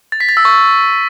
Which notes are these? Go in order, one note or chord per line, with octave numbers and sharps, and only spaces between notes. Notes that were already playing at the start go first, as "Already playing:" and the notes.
A6
B6
A6
E6
C#6